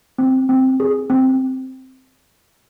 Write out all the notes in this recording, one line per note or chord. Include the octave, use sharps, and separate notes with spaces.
C4
C4
G#4
C4